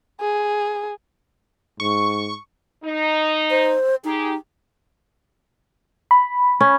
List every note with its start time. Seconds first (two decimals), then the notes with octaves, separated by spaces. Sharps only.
0.21 G#4
1.80 G#2 C#6
2.83 D#4
3.50 C5
4.05 D#4 G4 G#4
6.11 B5
6.61 C#4